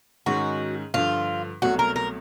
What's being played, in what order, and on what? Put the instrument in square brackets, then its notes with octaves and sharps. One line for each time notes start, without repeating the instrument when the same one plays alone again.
[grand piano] G#2 D#3 G#3 C#4 [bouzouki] F#4
[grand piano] G2 D3 F3 [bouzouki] F4
[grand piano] C2 B2 F#3 A3 [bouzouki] F#4
[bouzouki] A#4
A#4